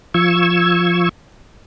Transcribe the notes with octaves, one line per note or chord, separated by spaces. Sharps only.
F3 C#6 E6 G#6